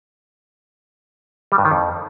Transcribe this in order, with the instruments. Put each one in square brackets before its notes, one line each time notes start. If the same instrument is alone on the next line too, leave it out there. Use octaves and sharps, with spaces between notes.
[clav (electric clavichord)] G3
G2
D#3
F2